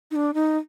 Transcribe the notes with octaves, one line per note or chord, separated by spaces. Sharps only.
D#4
D4
D#4